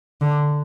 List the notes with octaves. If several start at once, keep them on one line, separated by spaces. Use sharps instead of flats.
D3